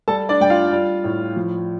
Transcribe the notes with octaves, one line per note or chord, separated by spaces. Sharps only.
G3 A4 A5
D4 D5
G3 G5
F4 F5
G3
A2
F3